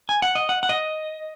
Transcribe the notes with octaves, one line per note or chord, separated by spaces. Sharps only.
G#5
F#5
D#5
F#5
F#5
D#5